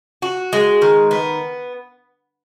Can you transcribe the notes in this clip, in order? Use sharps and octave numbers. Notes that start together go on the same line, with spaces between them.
F#4
G#3
D#3
B3